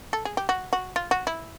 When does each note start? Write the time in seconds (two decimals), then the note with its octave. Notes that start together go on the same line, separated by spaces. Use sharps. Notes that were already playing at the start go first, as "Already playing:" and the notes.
0.13 A4
0.25 G#4
0.37 G4
0.49 F#4
0.73 F#4
0.96 F4
1.11 F#4
1.27 E4